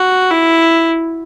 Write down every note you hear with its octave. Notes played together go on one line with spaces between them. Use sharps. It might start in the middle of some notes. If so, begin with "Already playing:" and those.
Already playing: F#4
E4